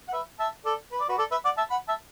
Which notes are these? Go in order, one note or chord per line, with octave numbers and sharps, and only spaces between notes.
F#5
B4 E5
E5 A5
A4 D5
B4
D5
F#4 B4
A4 D5
B4 E5
D5 F#5
E5 A5
F#5 B5
E5 A5